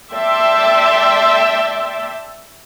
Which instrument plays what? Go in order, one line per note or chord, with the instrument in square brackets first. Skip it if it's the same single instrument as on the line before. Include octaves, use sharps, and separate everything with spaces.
[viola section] D5 E5 G5 A5 C6